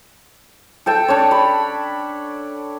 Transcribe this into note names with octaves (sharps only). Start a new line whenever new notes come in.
A4 G5 A5
D4 C#5
B5